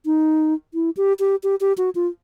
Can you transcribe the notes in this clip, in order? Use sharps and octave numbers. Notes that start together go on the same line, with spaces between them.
D#4
E4
G4
G4
G4
G4
F#4
F4